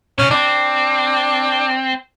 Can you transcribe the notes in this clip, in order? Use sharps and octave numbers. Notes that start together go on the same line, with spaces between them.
A#2 C#3 C#4
C4 D4